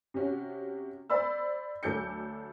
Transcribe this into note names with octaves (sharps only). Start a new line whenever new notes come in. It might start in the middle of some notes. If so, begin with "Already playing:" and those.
C3 C#4 F#4
C5 D5 B5 E6
D2 F#3 A4 D6 G6 C#7